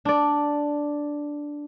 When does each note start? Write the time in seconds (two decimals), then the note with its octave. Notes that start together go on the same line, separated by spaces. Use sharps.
0.05 D4 D5